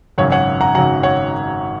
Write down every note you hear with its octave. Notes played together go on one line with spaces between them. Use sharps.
G#1 F#2 C#3 F#3 C#5 F#5
C#5 F#5
F#5 A#5
G#1 F#2 C#3 F#3 F#5 A#5
C#5 F#5